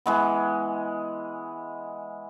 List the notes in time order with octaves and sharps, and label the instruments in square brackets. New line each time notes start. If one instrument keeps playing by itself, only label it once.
[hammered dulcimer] E3 G#3 B3